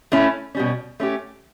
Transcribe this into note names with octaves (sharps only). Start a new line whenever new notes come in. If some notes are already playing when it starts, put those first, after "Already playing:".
A3 C#4 E4
B2 G3 C#4
A3 C#4 G4